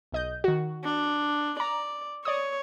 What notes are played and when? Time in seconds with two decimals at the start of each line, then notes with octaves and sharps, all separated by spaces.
0.12 B1 D#5 G6
0.44 D#3 F#4
0.84 D4
1.60 D5 A#5
2.25 C#5 D5 D#6